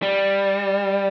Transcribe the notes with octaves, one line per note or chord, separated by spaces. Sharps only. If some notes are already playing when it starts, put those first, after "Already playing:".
G3